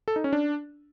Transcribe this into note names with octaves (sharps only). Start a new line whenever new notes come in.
A4
D#4
C#4
D4